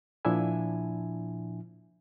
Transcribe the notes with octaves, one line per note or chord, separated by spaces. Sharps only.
A#2 F3 D4 E4 E5 G#5